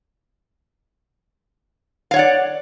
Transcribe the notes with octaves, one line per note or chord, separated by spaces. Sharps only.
C#5 D5 F5 F#5